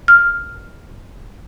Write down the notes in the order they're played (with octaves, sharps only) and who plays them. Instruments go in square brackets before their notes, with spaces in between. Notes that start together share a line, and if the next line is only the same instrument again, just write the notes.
[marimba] F6